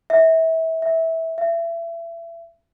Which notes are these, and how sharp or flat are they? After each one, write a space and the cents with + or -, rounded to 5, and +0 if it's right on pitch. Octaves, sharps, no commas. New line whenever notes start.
E5 -25
E5 -15
E5 +30